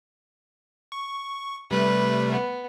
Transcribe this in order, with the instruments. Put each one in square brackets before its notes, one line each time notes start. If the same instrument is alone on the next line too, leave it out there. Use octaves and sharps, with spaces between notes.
[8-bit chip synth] C#6
[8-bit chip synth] C3 G3 A3 [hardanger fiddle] B4
[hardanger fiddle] B3